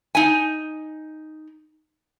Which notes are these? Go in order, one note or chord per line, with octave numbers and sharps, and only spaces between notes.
D#4 G#5